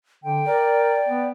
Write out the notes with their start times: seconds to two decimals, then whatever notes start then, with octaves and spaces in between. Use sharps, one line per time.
0.24 D3 G5
0.46 A#4 D5
1.09 B3